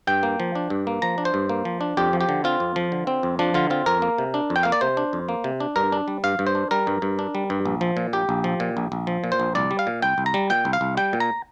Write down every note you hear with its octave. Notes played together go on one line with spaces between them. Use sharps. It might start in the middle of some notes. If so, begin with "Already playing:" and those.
G2 G5
A#3
F3
D4
G2
A#3
F3 A#5
D4
C5
G2
A#3
F3
D4
F2 G4
F3
G4
D3
C4 F4
F2
F3
D3
C4
F2
F3 D4
D3 F4
C4 F4
F2 A#4
A#3
C3
D4
F2
G5
A#3 F5
D5
C3 C5
D4
F2
A#3
C3
D4
G2 A#4
D4
G3
G2 F5
G2
C5
D4
G3 A#4
G2
G2
D4
G3
G2
A#1
F3
A#2
A#1 G4
A#1
F3
A#2
A#1
A#1
F3
A#2
C5
A#1
C2 D5
G3
F5
A#2
C2 G5
C2
A#5
G3
A#2 G5
C2
F5
C2
G3 G5
A#2
A#5